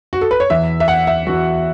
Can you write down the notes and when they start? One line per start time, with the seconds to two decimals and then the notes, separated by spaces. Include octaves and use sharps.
0.13 F#4
0.21 A4
0.31 B4
0.40 C#5
0.50 E2 E3 E5
0.80 E5
0.88 F#5
1.07 E5
1.27 E2 E3 F#4